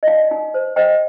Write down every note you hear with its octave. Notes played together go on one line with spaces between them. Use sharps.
D#5
D#4 D5 F5
D#4
C5
C5 D#5 G5